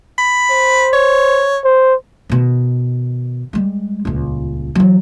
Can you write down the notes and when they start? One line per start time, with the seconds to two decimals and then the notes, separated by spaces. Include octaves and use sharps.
0.18 B5
0.51 C5
0.93 C#5
1.64 C5
2.29 B2 D#3
3.53 G3 G#3
4.05 D#1 C#2
4.75 E3 F#3